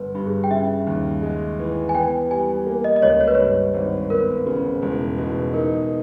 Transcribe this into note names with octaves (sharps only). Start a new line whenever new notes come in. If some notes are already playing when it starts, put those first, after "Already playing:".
Already playing: G1 B4
G2
G#4
G5
C#3 E5
D#2
G#3
E3
G#5
B3 G5
G3 G#5
A#3
D#5
D#5
C#2 C#5
C#5
B4
G2 C#5
G#1
B3 A#4
C#3
E1
B2
D#4 A#4